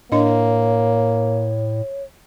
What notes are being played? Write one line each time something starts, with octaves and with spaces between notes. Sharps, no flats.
A2 A#3 D4 C#5 D#5